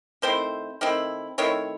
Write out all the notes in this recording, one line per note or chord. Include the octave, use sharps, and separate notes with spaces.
D#3 A3 C4 E4 C5
D#3 A3 C4 E4
D#3 A3 C4 E4 C#5